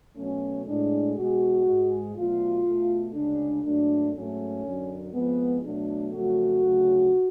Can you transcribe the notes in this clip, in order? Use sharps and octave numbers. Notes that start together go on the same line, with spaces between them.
B2 F#3 A3 C#4
A2 G#3 D4
B2 G#3 F#4
G#2 G#3
B2 F#3 A3 F4
B2 A3
D2 C#3 G#3 D4
G#2 F#3 A3 D4
G#2 F#3 A3 C#4
F#2 D3 F#3
F2 F3 G#3 B3
B2 F#3 A3 D4
F2 C#3 F#3 A3 F#4
D2 C#3 F#3 A3